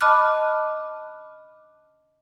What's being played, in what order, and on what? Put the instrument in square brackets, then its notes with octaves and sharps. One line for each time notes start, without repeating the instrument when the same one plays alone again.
[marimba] D#5 A5 B5 D6 F6 F#6